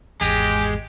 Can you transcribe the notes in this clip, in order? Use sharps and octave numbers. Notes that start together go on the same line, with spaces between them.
G#1 E2 G#3 G4